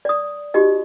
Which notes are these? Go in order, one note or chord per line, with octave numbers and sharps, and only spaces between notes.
D5 D#6
D#4 F#4 G4 D#5